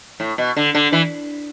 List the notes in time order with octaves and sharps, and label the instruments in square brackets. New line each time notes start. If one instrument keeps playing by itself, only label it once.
[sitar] A2
B2
D3
D3
E3